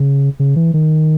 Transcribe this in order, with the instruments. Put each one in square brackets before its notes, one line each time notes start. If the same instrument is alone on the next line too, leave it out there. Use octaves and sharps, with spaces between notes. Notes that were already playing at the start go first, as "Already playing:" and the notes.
Already playing: [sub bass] C#3
C#3
E3
D#3